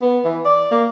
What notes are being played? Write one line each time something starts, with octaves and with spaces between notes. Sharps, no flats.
B3
E3
D5
A#3